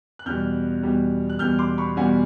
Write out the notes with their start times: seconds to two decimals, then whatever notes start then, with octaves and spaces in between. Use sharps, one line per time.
0.19 F#6
0.26 E2 B2 G3 F6 G6
0.83 E2 B2 G3
1.30 F#6
1.39 E2 B2 G3 F6 G6
1.59 C6 D6
1.78 B5 C#6
1.97 E2 B2 G3 F#5 G#5